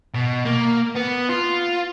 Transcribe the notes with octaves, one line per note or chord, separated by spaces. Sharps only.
B2
A#3
B3
F4